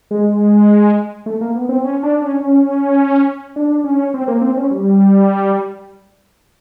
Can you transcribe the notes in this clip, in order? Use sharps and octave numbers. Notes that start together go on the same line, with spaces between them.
G#3
A3
A#3
B3
C4
C#4
D4
C#4
C#4
D4
C#4
C4
A#3
C4
C#4
G3